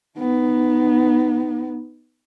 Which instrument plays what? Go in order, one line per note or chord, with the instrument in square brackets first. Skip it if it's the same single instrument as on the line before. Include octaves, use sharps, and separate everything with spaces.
[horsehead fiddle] B3 D#4